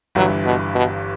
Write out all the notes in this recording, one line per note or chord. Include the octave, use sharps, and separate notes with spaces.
G1 G2 E3 F#3 G3
B2
B2